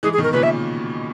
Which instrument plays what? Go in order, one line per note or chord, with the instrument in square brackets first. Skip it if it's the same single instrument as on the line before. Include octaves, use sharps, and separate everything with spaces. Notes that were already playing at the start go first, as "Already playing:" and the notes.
[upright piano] E3 G#3 [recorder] G#4
[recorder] G#4
[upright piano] B2 D#3
[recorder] A#4
[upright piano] A#2 C#3 [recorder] B4
[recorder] E5